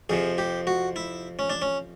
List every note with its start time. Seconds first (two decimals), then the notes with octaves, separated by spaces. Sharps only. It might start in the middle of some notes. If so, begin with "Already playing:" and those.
0.09 F2 C3 F3 G#4
0.38 G4
0.67 F#4
0.96 E4
1.39 C#4
1.50 D4
1.62 C#4